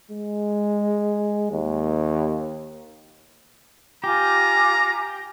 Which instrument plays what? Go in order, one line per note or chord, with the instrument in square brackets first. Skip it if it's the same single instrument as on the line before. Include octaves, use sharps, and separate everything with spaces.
[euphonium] G#3
D#2
[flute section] F4 G#5 D6 [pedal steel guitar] G4 [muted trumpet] A#5